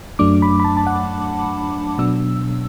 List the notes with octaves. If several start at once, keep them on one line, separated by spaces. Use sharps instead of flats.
F#2 F#3 A3 D4 D6
B5
B5
A5
A5
F#5
B2 F#3 B3 D4 E6